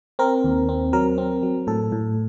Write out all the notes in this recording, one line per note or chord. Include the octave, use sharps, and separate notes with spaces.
C4 A#4
D#2
C4
F#3 A#4
C4
F#3
A2 A4
A2